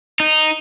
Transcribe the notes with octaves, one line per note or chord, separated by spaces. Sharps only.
D#4